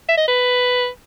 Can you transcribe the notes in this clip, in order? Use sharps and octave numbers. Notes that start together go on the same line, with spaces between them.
E5
D#5
B4